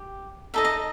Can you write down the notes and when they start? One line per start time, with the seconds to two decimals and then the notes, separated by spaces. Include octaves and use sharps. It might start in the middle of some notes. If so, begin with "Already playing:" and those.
Already playing: G4
0.54 D#4 A4 D#5 E5
0.65 D#5